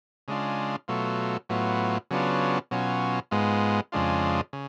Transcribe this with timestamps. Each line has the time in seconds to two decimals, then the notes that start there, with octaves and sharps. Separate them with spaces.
0.28 C#3 G#3 D4 F4
0.88 B2 F#3 A3 F4
1.49 A2 F#3 B3 F4
2.11 C#3 F#3 B3 D4 F4
2.71 B2 F#3 C#4 F4
3.31 G#2 G#3 B3 F4
3.92 F2 C#3 G#3 D4 F4
4.53 C#3